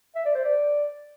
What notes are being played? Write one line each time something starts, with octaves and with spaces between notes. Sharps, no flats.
E5
D5
C5
D5